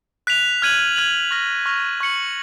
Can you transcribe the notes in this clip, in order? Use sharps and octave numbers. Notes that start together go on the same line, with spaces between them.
F#6 B6 F7
F6 G#6 D#7 F#7
F6 G#6 D#7 F#7
C#6 F6 A#6 F7
C#6 F6 A#6 F7
C#6 F#6 C#7 F#7